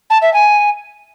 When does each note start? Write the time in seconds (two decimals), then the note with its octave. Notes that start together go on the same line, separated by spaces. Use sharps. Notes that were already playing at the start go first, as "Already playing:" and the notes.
0.10 A5
0.22 E5
0.34 G#5